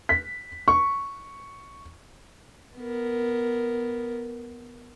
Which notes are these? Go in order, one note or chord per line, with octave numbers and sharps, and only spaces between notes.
B6
C#6
B3 A#4